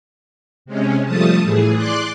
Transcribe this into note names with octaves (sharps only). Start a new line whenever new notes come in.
C3 G#3 C#4
F3 G3 A3 A5 D#6
A2 E3 G#4
D5 C6 D6 F#6